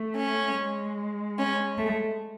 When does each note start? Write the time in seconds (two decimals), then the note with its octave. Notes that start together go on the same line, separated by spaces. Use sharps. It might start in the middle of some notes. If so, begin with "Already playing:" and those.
Already playing: A3
0.16 C#4
0.57 G#3
1.38 C#4
1.78 A3